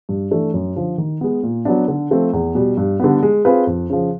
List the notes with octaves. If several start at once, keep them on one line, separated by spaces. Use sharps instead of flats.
G2
E3 A3 D4
F#2
D3 F3
D#3
G#3 B3
A#2
F#3 B3 D4
D3
F3 A3 C4
E2
B2 G3
G2
D3 G3 B3
G#3
C4 F4 G#4 B4
F2
C#3 F3